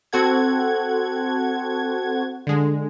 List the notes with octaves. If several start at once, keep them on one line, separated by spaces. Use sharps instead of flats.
C4 F#4 A4 F#5 G#6
D3 G#3